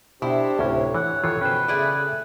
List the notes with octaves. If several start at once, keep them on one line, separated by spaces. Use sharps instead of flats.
B2 D4 E4 G4 C5
D2 A2 C3 C#4 C#5
E3 C#5 F#5
D#3 E3 F4 A4 C#5
B2 C#4 B4 C5 G5
C#3 A3 G#4 D5